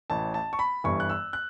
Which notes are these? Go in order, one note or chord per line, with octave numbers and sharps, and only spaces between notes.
A1 A2 E3 A5
A5
C#6
B5
G1 G2 E3 C#6
F#6
E6
F#6